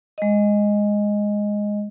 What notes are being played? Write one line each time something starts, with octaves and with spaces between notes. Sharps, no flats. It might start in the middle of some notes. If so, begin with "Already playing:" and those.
G#3 D#5